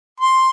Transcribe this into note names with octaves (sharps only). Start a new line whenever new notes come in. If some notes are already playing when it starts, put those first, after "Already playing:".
C6